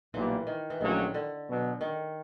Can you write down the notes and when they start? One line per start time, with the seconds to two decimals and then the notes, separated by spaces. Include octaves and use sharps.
0.13 B1 A#2 E3 G3 A#3
0.47 D#3
0.70 E3
0.80 A#1 A#2 D#3 F#3 A3 C#4
1.14 D3
1.47 B2 F#3 B3
1.81 D#3